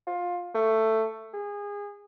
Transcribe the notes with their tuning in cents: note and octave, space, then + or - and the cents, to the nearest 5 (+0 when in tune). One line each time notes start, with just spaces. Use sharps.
F4 +20
A3 +10
G#4 -25